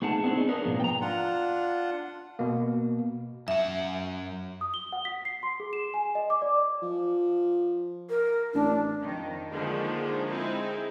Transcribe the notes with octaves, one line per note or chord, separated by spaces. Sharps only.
A3 D#4 G#4 F#5 A5
B3 C4 D4 E4 G#4
C#4 D#4 D5
D4 G#4 A#4 B4
G#2 B2 F3 A#3 B3
G5 A#5
D4 F4 F#5
B2 A#3
F#2 E5 F#5
D#6
G7
F#5
B6
C7
C6
G#4
E7
G#5
D#5
D6
D5
F3
A#4
A1 D4
F2 D#3
D3 D#3 F3 G#3 A#3 D4
G#3 C4 D#4 E4 G#4